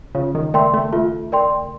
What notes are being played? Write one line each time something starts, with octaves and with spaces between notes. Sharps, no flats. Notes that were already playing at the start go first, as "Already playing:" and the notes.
C#3 F4
D#3
A3 A#4 D5 G5 C6
A3
A3 F4
A#4 D5 G5 C6